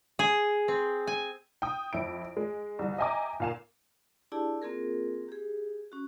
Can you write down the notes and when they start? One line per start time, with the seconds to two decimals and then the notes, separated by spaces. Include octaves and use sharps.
0.19 G#4
0.68 C4
1.07 G#5
1.62 G5 D#6
1.93 F2 E4 D7
2.37 G#3
2.79 G1 C2
2.98 D#5 E5 G5 G#5 A#5 D6
3.40 A#2 A#3 F5 G#5 E7
4.32 D4 E4 G4 G#4 D5 A5
4.62 A#3 C4 F4 G#4 A#4
5.29 G4 G#4
5.92 C#4 F#4